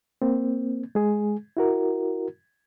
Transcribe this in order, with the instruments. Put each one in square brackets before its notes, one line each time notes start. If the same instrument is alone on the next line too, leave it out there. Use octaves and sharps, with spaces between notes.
[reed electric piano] A#3 C4
G#3 G#4
E4 F#4 A#4